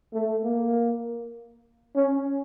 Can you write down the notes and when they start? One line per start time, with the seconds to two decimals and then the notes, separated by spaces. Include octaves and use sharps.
0.14 A3
0.44 A#3
1.96 C#4